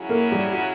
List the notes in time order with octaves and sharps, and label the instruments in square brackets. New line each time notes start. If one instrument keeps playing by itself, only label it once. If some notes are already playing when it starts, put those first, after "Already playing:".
Already playing: [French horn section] C#3 F#3 C#4 E4
[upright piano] A#3 A#4
G3 G4
F#4